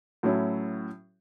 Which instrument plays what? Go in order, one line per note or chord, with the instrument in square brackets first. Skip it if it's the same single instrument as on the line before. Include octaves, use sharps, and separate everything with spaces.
[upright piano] A2 F#3 C#4 E4